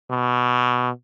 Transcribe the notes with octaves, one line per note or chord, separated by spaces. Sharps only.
B2